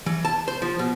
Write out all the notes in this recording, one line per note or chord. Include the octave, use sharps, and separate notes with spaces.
E3
A5
C5
F3
B2